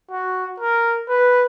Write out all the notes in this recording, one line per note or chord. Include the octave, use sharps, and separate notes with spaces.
F#4
A#4
B4